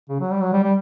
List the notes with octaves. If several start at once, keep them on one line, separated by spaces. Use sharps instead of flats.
C#3
F#3
G3
F#3
G3
G3